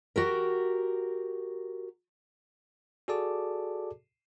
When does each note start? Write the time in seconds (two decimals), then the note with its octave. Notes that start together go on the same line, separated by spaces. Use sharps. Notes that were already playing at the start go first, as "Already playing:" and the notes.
0.16 F#4 G4 A#4
3.08 F#4 G#4 A4 D5 A5 D6